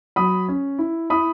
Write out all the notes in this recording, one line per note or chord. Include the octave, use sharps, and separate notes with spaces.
F#3 B5 D#6
C#4
E4
E4 B5 D#6